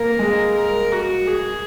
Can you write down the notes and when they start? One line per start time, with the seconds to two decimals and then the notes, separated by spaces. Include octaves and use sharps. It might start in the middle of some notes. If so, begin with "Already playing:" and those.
Already playing: A#3 A#4
0.19 G#3
0.55 A#4
0.92 F#4
1.27 G#4